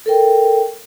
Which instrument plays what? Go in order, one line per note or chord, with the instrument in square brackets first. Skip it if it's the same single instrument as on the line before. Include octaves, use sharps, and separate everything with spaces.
[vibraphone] A4 A#4 G5